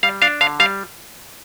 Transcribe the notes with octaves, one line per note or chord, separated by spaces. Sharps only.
G3 F5
D4 F5
D3 F5
G3 F5